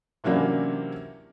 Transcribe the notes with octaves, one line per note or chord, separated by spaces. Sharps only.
C3 E3 F#3 A#3 C#4 D4